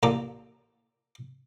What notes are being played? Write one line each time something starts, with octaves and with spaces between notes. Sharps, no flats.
A1 A#2 A4 A#5 D6